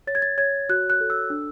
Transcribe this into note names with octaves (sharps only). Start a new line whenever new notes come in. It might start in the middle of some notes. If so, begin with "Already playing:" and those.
C#5 A6
G#6
A6
C#5 G#6
F#4 F#6
F#6
A4
E6
D4